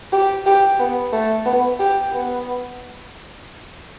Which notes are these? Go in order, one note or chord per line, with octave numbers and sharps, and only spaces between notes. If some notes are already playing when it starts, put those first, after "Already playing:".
G4
G4
B3
A3
B3
G4
B3